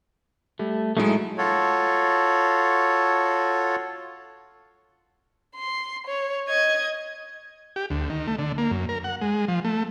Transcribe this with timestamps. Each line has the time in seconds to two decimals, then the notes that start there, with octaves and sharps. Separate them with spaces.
0.59 G3 A3
0.97 A2 F#3 G#3 A3 D#4 E4
1.38 F4 F#4 A4 C#5
5.55 C6
6.07 C#5
6.48 D#5 G#6
7.76 G4
7.90 D2
8.10 D#3
8.28 A3
8.39 D3
8.58 A#3
8.71 F#2
8.89 A#4
9.04 F#5
9.21 G#3
9.48 F3
9.65 A3